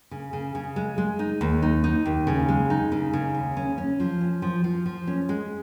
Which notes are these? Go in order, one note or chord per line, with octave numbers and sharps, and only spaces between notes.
C#3
C#3
C#3
G#3
G#3
D#4
D#2
D#4
D#4
D#2
C#3
G#3
D#4
C#3
C#3
D#2
C#4
C#4
F3
C#4
F3
F3
F3
C#4
G#3